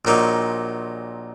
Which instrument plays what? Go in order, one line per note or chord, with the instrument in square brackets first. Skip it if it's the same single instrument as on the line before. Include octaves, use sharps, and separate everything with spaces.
[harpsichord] A#1 A#2 F#3 A#3 D#4